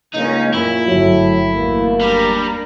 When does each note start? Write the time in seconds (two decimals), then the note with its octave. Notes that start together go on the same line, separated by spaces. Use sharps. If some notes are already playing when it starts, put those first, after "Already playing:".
0.14 C#2 A#3 C#4 D#4
0.54 F#2 A#2 E4
0.88 G1 A2 F#3
1.54 E2 A3 A#3
2.01 G3 D4 A#4